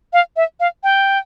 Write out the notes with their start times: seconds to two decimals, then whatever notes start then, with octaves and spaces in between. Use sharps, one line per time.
0.13 F5
0.36 E5
0.60 F5
0.83 G5